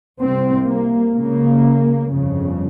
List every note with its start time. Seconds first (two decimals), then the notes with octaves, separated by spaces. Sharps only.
0.20 C2 C3 C4
0.67 A#3
1.14 C#2 C#3 A#3
2.07 G1 F2 C#3